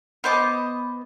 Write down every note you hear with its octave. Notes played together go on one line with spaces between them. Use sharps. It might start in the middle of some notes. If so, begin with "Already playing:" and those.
B3 C5 D#5 D6